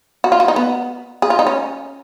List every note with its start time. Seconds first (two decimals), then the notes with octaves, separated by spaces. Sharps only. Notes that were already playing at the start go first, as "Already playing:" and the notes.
0.24 F#4
0.32 F4
0.40 F#4
0.48 D#4
0.56 B3
1.22 G#4
1.30 F4
1.39 D#4
1.47 C#4